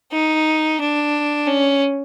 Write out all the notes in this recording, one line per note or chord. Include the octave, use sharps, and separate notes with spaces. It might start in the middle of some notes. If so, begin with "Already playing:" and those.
D#4
D4
C#4